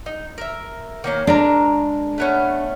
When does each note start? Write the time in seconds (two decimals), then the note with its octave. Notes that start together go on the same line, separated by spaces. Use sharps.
0.06 D#4
0.38 A#4 E5
1.04 D#3 A#3 C#4
1.27 G#3 D4 A#4 A#5
2.18 A3 B3 C#4